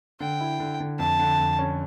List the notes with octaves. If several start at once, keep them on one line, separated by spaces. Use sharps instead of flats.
D3 G5
E4
D3
D3
F2 A5
D3
F2
C#4